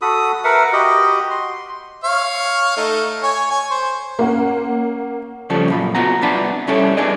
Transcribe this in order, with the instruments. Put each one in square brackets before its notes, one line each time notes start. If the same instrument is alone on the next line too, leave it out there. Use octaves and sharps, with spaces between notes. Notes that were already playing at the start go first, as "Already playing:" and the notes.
[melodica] F#4 A4 B5 D#6
A#4 B4 E5 F#5
F#4 G4 D#5 B5
C6
[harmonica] C#5 F5
A3 D#4
C#5 G#5
G#5 C#6
C5
[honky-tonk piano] A#3 C#4 F#5
[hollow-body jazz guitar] C#3 F3 G3 A4
F#2 A#2 B5
B3 F4 F#4 F#5 A#5
C2 B3 D4 F#5 A5 B5
C2 G3 C#4 E4 A4 C#5
D4 E4 G#4 B4 D5 D#5